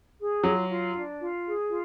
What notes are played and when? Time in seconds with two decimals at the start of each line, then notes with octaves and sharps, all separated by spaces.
0.18 G#4
0.43 F#3 F4
0.69 F4
0.94 D4
1.19 F4
1.45 G#4
1.69 F4